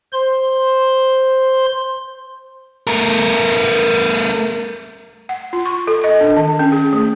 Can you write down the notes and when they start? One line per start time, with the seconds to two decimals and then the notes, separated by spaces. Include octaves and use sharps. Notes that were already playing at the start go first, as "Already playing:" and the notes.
0.13 C5 C6
2.87 A3 A#4
5.29 F#5
5.53 F4
5.66 C#6
5.87 A4
6.04 D#5
6.21 D4
6.36 D#3
6.59 C#4
6.72 G#4
6.93 A3